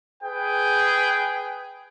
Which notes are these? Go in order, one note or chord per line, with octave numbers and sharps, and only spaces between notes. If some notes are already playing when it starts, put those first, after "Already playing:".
G#4 B4 G5